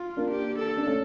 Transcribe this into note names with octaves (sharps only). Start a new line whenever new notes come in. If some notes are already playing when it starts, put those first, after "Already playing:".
Already playing: F4
A#3 D4
G4
A4
D4
A3 C#4